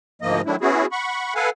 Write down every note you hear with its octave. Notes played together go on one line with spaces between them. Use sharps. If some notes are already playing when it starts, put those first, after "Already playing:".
D2 G#2 F3 A#3 D#5
D#3 F#3 A3 D4 E4
B3 C#4 E4 F#4 G#4
F#5 B5 C#6
A4 B4 F5 F#5 G#5